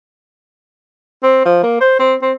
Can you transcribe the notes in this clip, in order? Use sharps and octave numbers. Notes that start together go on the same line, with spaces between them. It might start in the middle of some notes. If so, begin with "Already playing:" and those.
C4
F3
A#3
C5
C4
C4